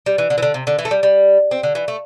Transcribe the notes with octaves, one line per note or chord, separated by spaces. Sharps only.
G3
E3
D3
E3
D3
C3
D3
E3
A3
G3
G3
C4
D3
E3
A3